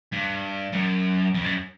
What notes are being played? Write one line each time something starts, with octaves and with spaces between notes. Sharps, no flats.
G2
F#2
F2
F#2